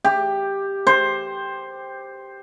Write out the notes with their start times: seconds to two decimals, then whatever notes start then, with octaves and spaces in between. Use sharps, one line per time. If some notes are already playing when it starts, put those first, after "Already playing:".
0.04 G4
0.87 C5